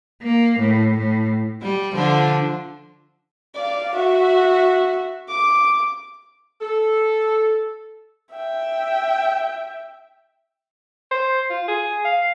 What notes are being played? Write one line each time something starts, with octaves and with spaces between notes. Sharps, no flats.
A#3
A2
A2
G3
D3 F3 D4
D5 F5
F#4 E5
D6
A4
E5 G5
C5
F4
G#4
F5